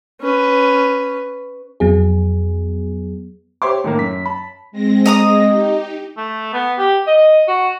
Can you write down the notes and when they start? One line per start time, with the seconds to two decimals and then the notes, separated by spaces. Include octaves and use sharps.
0.21 C#4 B4
1.80 F2 F#3 B3 G#4
3.62 G4 C5 C#5 E5 C6 D6
3.84 A2 D#3 A#3
3.97 F#2 B6
4.26 A5 B5
4.72 G#3 C4 A#6
5.06 D#5 A#5 D#6
5.46 D#4 G4
6.17 A3
6.53 B3
6.78 G4
7.07 D#5
7.48 F#4